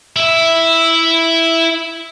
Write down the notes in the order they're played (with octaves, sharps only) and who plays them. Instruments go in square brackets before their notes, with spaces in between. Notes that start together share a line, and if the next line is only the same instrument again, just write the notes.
[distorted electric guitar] E4 E5